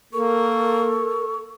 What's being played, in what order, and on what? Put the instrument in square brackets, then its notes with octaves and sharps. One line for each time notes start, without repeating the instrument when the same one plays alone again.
[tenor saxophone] A#3 [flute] A4 [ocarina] A#4 [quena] C#6